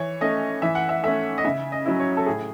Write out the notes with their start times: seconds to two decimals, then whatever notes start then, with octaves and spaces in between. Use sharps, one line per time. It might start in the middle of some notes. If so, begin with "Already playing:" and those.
Already playing: E3 C#5
0.21 A3 C#4 D#5
0.62 E3 E5
0.75 F#5
0.89 E5
1.03 A3 C#4 E5
1.38 D#5
1.45 C#3 E5
1.72 D#5
1.86 F#3 C#4 E4
2.00 C#5
2.17 A4
2.26 A2 G#4